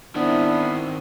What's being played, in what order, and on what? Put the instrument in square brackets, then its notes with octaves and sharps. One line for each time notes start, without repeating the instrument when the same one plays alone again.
[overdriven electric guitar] D#3 C4 [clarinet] B3 [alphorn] D4 [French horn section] E4